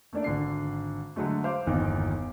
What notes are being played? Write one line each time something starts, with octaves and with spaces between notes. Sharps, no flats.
A3 A#3 D4 D5
G#1 D3 C7
D3 F#3 G#3 A3
C5 F5 D6
G1 E2 A#2 D#3